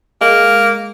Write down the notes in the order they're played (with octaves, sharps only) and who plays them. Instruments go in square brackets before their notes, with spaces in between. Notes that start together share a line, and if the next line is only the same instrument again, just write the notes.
[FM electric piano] G#3 [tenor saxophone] A#3